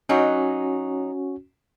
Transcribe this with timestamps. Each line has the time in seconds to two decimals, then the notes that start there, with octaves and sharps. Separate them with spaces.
0.09 F#3 C#4 D#4 F#4